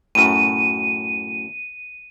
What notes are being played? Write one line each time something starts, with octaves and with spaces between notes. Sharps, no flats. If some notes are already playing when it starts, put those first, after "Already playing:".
F#2 A2 D#7